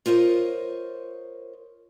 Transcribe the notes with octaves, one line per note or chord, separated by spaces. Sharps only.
F4 A#4 C5 C#5 D#5